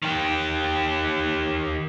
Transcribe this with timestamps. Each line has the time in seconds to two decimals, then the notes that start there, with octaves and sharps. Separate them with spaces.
0.03 D#3 G4